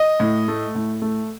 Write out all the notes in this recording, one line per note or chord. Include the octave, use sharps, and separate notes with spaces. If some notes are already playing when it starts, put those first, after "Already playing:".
Already playing: D#5
A2
A3
A2
A3